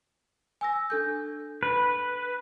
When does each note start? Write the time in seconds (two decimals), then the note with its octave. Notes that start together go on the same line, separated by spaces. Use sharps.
0.61 G#5 E6 A#6
0.90 D4 A4 G6
1.63 B4